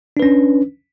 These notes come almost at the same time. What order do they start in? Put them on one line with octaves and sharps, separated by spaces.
D4 B4 C#4